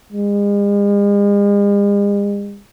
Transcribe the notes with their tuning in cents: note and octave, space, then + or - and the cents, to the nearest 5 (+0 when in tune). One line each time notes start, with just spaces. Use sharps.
G#3 -45